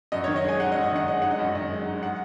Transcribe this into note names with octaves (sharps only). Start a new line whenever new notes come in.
F#2 D#5
C#5
D#3
D#5
G#3 G#5
D#4 F#5
D#5
F#2
D#5
D#3 F#5
G#3 D#5
D#4 F#5
D#5
F#2
D#3 D#5
G#3
D#4
F#5